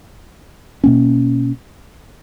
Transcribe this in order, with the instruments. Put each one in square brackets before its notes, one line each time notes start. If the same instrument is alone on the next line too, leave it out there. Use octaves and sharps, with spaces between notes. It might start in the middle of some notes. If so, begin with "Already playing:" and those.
[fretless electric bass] B2 A#3 C#4